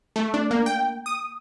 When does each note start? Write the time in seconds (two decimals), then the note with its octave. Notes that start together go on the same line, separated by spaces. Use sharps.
0.16 A3
0.34 D4
0.51 A#3
0.66 G5
1.06 D#6